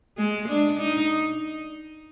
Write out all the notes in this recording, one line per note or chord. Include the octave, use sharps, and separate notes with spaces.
G#3
D4
D#4